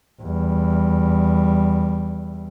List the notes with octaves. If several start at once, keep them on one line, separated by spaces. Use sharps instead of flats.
E2 G3